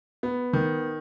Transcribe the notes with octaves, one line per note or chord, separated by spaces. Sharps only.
B3
D#3